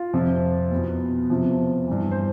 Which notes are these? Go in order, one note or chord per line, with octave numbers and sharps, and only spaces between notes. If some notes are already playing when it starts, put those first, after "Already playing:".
Already playing: F4
F2 C3 F3
E2 B2
E2 C3 F3
G2 E3
C5